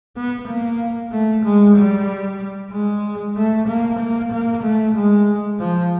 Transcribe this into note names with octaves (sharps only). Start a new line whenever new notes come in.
B3
A#3
A3
G#3
G3
G#3
A3
A#3
A#3
A#3
A3
G#3
F3